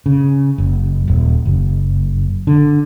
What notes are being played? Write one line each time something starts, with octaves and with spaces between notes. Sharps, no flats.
C#3
F#1
D#1
F#1
D3